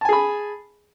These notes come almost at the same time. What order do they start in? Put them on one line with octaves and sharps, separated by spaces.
A5 G#5 G#4 B5